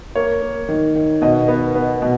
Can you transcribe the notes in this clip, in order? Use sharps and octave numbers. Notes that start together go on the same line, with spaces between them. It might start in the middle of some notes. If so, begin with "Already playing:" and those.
A#3 C#5
A#3
D#3
D#3
B2 D#5
B3
B3
B2